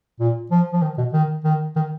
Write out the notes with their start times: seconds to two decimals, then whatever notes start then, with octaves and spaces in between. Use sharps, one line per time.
0.20 A#2
0.51 F3
0.73 F3
0.82 D#3
0.98 B2
1.13 D#3
1.45 D#3
1.76 D#3